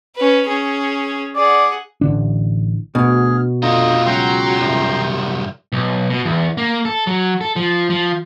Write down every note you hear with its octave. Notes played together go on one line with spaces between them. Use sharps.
C#4 B4
C#4 G#4
G#4 D5 F#5
A1 D3 D4
D2 B2 G#4 F6
D3 A3 F4 D#5 A#5
C#2 F#3 G5 A#5 C6
C2 F#2
B1
B2
E2
A#3
A4
F#3
A4
F3
F3